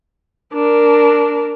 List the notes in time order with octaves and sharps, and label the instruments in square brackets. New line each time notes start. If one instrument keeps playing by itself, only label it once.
[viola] D4 A#4